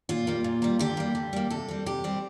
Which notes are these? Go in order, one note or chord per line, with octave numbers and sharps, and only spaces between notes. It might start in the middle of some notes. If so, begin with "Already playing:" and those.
A#2 F4
G3 A#3
A#2
G3 A#3
D3 G4
G3 A#3
D3
G3 A#3
C3 A4
G3 C4
C3 G4
G3 C4